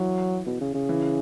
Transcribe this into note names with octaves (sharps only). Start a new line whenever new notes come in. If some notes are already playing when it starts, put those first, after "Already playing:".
Already playing: E3 F#3
B2
C#3
C#3
E3